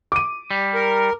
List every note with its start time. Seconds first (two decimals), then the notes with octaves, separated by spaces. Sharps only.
0.12 D6 D#7
0.51 G3
0.75 A#4